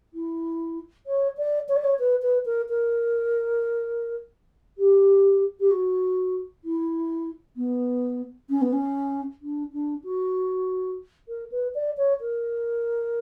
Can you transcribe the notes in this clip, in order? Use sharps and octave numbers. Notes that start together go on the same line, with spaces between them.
E4
C#5
D5
C#5
D5
C#5
B4
B4
A#4
A#4
G4
G4
F#4
E4
B3
C#4
B3
C#4
D4
D4
F#4
A#4
B4
D5
C#5
A#4